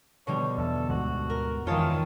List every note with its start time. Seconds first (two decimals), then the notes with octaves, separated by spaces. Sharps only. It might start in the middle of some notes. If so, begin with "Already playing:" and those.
0.27 B2 D3 G3 C#5
0.58 E2 A4
0.89 D2 G#2 F#4
1.30 A#4
1.67 F2 D#3 E3 G#3 F4 C#5 A5